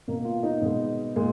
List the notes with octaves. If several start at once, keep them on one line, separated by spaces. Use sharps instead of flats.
B2 A#3
F4
D#4
B2 G#3
A#2 G#3